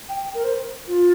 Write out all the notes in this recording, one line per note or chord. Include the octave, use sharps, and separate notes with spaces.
G5
A#4
C5
F4